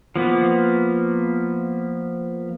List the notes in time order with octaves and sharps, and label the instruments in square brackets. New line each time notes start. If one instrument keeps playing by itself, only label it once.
[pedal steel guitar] F3 A#3 B3